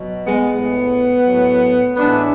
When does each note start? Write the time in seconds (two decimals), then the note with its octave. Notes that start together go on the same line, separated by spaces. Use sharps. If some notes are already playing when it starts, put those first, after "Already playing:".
Already playing: B2 F#3
0.25 G#3 B3
0.49 A2 G#3
1.23 A2 F#3
1.97 A2 E3 G#3 B3 D4